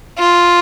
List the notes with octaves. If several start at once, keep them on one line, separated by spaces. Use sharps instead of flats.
F4